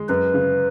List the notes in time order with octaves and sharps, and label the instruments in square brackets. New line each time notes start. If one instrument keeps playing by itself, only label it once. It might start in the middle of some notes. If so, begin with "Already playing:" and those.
Already playing: [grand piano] G#3
[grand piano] F#2 [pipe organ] B4
[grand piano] C#3